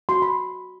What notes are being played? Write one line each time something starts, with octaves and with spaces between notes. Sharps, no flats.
F#4 C6
B5